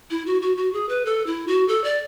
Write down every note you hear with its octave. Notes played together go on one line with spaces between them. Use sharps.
E4
F#4
F#4
F#4
G#4
B4
A4
E4
F#4
A4
D5